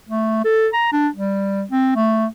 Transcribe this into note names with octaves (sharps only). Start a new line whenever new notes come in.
A3
A4
A#5
D4
G3
C4
A3